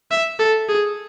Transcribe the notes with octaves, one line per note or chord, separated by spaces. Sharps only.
E5
A4
G#4